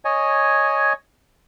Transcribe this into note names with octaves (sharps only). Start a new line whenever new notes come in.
C#5 D#5 G#5